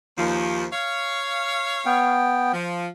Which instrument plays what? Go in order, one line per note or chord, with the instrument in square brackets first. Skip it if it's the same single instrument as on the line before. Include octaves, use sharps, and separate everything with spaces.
[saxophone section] D#2 F3
C#5 F5
[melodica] B3 G5
[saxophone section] F3